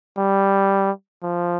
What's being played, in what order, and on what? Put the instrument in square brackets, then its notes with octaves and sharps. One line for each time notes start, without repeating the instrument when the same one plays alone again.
[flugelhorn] G3
F3